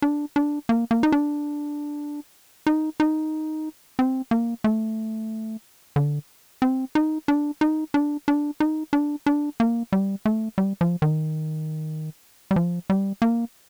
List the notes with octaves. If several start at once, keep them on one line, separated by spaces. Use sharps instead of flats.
D4
D4
A#3
A#3
D#4
D4
D#4
D#4
C4
A#3
A3
D3
C4
D#4
D4
D#4
D4
D4
D#4
D4
D4
A#3
G3
A3
G3
F3
D#3
G3
F3
G3
A#3